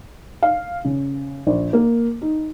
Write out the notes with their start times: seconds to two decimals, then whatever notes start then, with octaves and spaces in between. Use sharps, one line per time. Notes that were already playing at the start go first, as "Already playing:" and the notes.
0.43 F5
0.85 C#3
1.47 A#1
1.73 A#3
2.22 D#4